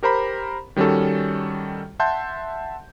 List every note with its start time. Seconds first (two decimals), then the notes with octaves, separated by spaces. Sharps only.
0.03 G4 A#4 C5 A#5 B5
0.76 D#3 G3 C#4 F#4 A4
2.00 E5 F#5 A5 C6 G6